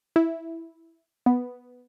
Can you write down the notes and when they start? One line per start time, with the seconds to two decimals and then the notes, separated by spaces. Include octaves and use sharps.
0.16 E4
1.26 B3